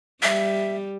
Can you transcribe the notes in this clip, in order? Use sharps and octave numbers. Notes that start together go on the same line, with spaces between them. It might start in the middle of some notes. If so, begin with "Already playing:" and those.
G3 E5